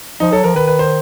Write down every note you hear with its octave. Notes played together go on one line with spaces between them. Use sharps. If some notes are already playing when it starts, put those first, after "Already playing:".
F3 D#4
F#3 A4
F3 A#4
D#3 B4
B4
C5